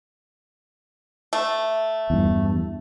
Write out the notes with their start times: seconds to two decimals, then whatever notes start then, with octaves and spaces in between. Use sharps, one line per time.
1.33 A3
2.10 E2 G2